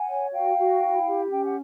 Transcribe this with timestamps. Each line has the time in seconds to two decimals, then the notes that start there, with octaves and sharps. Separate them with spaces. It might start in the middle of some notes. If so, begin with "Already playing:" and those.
Already playing: F#5 G#5
0.09 C#5
0.33 F#4 F5 G5
0.58 F#4
0.82 E4
1.07 G4
1.31 C#4 G5
1.44 F#5